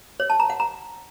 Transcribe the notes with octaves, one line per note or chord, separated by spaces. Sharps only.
C#5
A5
A#5
F#5
A#5